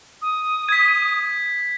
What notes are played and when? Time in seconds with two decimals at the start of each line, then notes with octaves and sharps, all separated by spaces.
0.22 D#6
0.69 G#6 B6